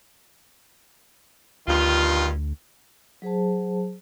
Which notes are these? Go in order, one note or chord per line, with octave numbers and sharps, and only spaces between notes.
D2 G2 D#3 F4
F#3 G#4 C5 A5